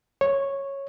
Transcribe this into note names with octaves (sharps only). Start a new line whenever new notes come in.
C#5